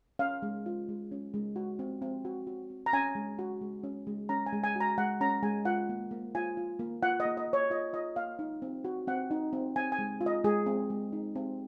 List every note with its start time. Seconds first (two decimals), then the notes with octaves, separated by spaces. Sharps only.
0.19 C#4 F5
0.42 G#3
0.66 F4
0.89 G#3
1.12 C#4
1.34 G#3
1.56 F#4
1.79 C4
2.02 C4
2.25 F#4
2.47 F#4
2.70 C4
2.86 A#5
2.93 C#4 G#5
3.15 G#3
3.39 F#4
3.61 G#3
3.83 C#4
4.07 G#3
4.29 C#4 A#5
4.46 G#5
4.53 G#3
4.64 G#5
4.76 F#4 A#5
4.98 G#3 F#5
5.21 C#4 A#5
5.43 G#3 G#5
5.65 F4 F#5
5.89 A#3
6.11 A#3
6.35 F4 G#5
6.57 F4
6.79 A#3
7.02 F4 F#5
7.20 D#5
7.25 A#3
7.37 D#5
7.48 A#3 C#5
7.70 F4 D#5
7.93 F4 D#5
8.16 A#3 F5
8.39 D#4
8.62 C4
8.84 F#4
9.07 C4 F#5
9.31 D#4
9.53 C4
9.76 C4 G#5
9.92 G#5
9.99 G#3
10.21 F4
10.26 D#5
10.44 G#3 G#4
10.66 C4
10.90 G#3
11.13 D#4
11.35 C4